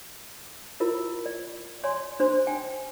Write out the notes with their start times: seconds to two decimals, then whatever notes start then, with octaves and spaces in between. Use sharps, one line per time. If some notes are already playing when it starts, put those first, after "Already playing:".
0.80 E4 F4 A#4
1.26 D5
1.84 C#5 D5 G#5 C6
2.20 D4 C5 C6
2.47 G5 G#5